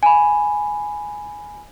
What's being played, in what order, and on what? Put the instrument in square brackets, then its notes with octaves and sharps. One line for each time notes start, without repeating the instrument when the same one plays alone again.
[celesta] G#5 B5